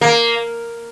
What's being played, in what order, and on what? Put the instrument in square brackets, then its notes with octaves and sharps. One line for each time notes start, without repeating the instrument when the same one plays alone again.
[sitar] A#3